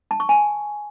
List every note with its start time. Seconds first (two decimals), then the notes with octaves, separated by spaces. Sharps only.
0.11 A5
0.20 C#6
0.29 G#5